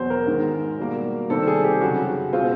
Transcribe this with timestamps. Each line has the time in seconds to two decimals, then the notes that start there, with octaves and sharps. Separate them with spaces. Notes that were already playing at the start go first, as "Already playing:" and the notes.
Already playing: E2 B2 F#3 B3 C5
0.10 A#4
0.27 G#2 D#3 G#3
0.79 B2 G3 A#3
1.30 C3 D#3 G3 C4 A4
1.48 G#4
1.64 G4
1.81 F#2 C#3 F#3 F#4
2.33 B2 G#3 C4 F4